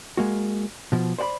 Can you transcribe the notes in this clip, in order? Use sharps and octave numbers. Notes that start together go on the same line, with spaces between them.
G#3 A#3 F#4
B2 F3
C5 D5 F#5 B5